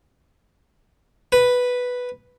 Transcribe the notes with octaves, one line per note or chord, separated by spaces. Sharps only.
B4